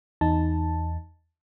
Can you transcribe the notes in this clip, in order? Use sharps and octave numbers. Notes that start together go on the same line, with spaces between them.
E2 D#4 A5